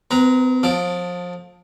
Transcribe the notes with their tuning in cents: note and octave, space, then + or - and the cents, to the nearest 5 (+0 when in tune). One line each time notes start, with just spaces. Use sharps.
C4 -45 B4 -15 A#5 +0
F3 +30 A4 +0 D6 +0